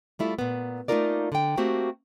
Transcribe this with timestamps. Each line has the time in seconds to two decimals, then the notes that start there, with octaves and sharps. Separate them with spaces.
0.19 G3 A3 E4 F4
0.39 A#2 B3
0.88 A3 A#3 D#4 F4 A#4 D5
1.32 D3 G5
1.57 A3 A#3 C4 F#4 G4